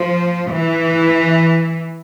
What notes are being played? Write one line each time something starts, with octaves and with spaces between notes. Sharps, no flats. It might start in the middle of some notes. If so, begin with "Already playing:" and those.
Already playing: F3
E3